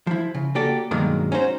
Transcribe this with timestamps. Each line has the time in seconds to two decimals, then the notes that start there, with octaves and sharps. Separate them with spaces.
0.07 F3 E4
0.35 C#3
0.55 A#3 F#4 G4 A4 D5
0.91 G2 B2 D#3 F#3 G#3 A#3
1.32 C#4 D#4 F#4 C5